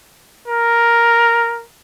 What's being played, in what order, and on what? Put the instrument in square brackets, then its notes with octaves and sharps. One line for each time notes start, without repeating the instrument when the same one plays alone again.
[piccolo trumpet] A#4